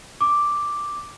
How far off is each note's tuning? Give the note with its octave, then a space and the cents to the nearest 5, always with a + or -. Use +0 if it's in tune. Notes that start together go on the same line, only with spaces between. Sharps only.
D6 +0